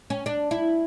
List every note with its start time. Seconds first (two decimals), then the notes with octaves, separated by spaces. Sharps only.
0.10 C#4
0.26 D4
0.51 E4